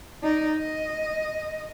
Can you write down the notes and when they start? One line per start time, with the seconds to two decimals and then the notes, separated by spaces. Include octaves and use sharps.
0.23 D#4 D5
0.58 D#5